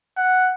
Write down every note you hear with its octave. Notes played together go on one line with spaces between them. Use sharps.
F#5